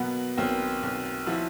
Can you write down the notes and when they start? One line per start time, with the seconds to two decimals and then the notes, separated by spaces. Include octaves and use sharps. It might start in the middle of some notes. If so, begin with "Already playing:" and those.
Already playing: B2 F#3 A#3 B3
0.37 B1 A#3 C4
0.83 B1
1.26 F3 E4 F#4